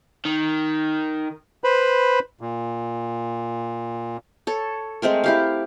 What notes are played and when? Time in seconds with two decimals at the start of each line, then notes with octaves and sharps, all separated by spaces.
0.25 D#3
1.64 B4 C5 B5
2.41 A#2
4.47 A4 C#5
5.02 G#3 A3 C4 A#4
5.24 E4 G4 F5